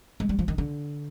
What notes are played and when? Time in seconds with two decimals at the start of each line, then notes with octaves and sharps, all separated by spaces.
0.20 G#3
0.29 G3
0.39 F3
0.48 D#3
0.58 D3